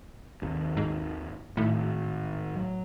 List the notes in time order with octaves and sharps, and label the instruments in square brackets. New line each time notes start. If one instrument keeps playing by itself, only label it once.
[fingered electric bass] G#1 D#2
[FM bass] G#2
[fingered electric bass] G#1 [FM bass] A2
[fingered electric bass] F#3